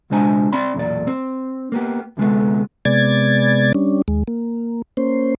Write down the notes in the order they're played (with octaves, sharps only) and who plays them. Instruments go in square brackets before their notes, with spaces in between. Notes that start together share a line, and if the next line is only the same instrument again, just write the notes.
[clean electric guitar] C#2 B2 G#3 D4 C5 G#5
C4 D5 B5 C6
B1 E2 A#2 D5
C4
A#3 B3 G4
D2 C3 G#3 A3 B3
[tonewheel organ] C3 G#3 B3 D5 G#6 A6
G3 C#4 D4
D#2 G#3
A#3
A#3 C#4 C5